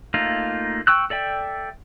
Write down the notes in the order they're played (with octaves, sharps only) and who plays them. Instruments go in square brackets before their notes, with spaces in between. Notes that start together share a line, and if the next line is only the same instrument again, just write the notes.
[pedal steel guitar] A3 A#3 D#4 F4
G5 C#6 E6 F#6
A4 D5 E5 G5